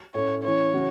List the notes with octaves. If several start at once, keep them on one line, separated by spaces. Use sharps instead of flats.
A2 A3 C#4 C#5
E3 C#4 E4 C#5
C#3 E3 C#4 F#4